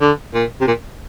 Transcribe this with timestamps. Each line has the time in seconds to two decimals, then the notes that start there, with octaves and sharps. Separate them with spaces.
0.01 D3
0.34 A#2
0.61 C3
0.67 A#2